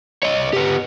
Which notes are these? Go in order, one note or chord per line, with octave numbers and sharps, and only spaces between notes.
C#5 D#5
B3 G4